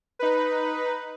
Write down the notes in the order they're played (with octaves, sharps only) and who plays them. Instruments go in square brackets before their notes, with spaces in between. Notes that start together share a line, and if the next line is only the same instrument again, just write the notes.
[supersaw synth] D#4 B4